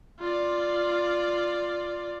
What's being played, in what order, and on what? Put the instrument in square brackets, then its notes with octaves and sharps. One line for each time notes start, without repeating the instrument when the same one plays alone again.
[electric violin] F4 D5